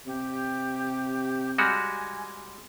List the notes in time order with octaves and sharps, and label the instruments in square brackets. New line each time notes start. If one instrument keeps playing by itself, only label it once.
[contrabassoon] C3 [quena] G4
[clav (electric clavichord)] G3 G#3 F#4 [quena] G#5